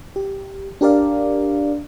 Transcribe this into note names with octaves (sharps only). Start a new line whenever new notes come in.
G4
D4 G4 A#4 D5 F5